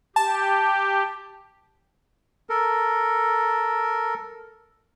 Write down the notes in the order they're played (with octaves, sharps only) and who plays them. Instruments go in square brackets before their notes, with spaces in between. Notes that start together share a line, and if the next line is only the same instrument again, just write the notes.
[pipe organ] G4 [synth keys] A5
[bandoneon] A4 A#4